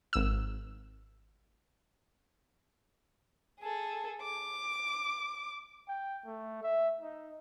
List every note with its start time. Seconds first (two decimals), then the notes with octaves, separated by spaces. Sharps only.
0.13 G#1 E6
3.60 G#4 A4
4.22 D6
5.88 G5
6.26 A3
6.63 E5
7.00 D#4